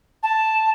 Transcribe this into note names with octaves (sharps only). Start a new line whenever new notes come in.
A5